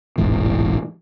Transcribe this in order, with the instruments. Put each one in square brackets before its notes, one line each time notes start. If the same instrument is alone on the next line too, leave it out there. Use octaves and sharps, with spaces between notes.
[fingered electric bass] E1 A1 G#2 E3